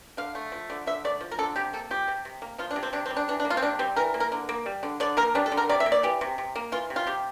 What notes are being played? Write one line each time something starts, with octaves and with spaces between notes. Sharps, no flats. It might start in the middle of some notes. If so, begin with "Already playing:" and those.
D3 F5
A3
F3
D3
D3 E5
A3 D5
F3
A#4
D3 A4
C3 G4
A#3 A4
F3 G4
C3
C3
A#3
F3 F4
D4
C3
C4
C3 D4
C4
G3
D4
E3 D4
D4
A#3
F4
C4
C3 D4
G3 C4
E3 A#4
A#3
A#4
D3
A#3
G3
D3
D3 D5
A#3 A#4
G3 D4
A4
D3
A#4
C3 D5
E5
A#3
D5
E3 G4
C3
C3
A#3
E3 F4
C3
F4
C3 G4